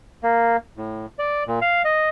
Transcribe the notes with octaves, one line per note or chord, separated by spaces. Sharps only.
A#3
A2
D5
A#2
F5
D#5